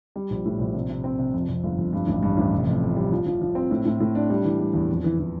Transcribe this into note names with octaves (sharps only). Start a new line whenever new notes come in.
G3
A#1
A2
A#1
C3
C3
C4
C3
F2
F2
G1
F2
G2
A1
G2
A1
F1
F2
F2
G3
F3
F3
F3
C4
A2
A2
A2
D4
G3
E3
G3
E2
F2
E3
E3